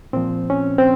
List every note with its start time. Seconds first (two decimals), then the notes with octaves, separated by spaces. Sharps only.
0.13 A#2 F3 C4
0.50 C#4
0.78 C4